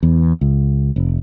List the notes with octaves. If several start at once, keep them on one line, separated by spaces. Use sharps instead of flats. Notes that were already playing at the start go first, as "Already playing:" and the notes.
E2
C#2
F1